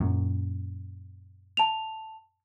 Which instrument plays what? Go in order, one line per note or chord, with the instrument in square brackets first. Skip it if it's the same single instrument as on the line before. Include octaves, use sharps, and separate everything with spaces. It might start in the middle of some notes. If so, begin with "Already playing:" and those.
[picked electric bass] F#2 A#2
[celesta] A5 F7